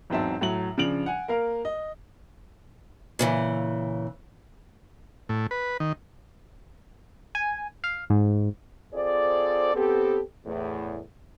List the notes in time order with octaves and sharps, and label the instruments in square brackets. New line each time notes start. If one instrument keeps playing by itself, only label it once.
[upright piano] E2 G#2 F#3 C4 E5 A5
A2 F#3 F#7
C#3 F3 D4 D7 F7 F#7
F#5 G#5
A#3 A#4 F5
D#5
[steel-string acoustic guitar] A#2 C#3 E3
[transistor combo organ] A2
B4
D#3
[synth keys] G#5
F5
G#2
[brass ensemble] C4 F4 G#4 A4 C5 D5
B3 C4 G4 A4
E2 A2